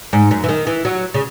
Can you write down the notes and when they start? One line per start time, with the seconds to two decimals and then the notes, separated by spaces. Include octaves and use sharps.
0.13 G#2
0.31 F#2
0.44 E3
0.49 D#3
0.67 E3
0.85 F#3
1.14 C#3